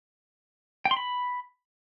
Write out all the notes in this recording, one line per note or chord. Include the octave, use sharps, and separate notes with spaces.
G5
C6
B5